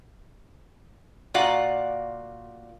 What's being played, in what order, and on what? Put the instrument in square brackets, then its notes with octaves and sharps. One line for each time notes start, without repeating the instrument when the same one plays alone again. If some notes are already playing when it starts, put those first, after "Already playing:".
[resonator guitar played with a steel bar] A#2 F4 F#4 D5 F5 F#5